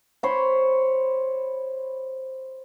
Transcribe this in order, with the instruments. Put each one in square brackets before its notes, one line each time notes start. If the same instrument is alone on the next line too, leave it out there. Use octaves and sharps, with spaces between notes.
[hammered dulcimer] C5 C#5 B5 C6